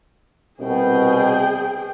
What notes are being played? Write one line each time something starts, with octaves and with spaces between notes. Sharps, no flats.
C2 B2 G#4 G5